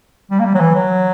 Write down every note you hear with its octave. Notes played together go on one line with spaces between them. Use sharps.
G3
A#3
G3
F#3
E3
F#3